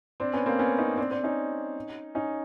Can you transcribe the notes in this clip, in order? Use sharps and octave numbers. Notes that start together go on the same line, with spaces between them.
C4 D4
B3 C#4
A#3 C4
B3 C#4
C#4 D#4
C4 D4
C4 D4
C#4 D#4
C#4 D#4